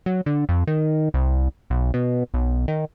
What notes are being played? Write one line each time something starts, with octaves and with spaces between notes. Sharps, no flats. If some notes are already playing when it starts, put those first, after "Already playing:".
F#3
D3
F2
D#3
C2
B1
B2
B1
D#3